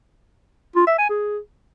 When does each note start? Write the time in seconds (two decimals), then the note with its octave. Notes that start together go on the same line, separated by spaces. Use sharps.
0.76 F4
0.87 E5
0.98 G#5
1.10 G#4